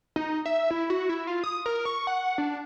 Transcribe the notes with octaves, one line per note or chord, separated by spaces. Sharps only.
D#4
E5
E4
F#4
E4
F4
D#6
A#4
C#6
F#5
D4